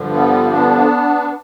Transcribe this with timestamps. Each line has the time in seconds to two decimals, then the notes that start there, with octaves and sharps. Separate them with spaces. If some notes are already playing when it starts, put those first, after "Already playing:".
Already playing: G2 D3 F3
0.12 G3 B3
0.51 B3 D4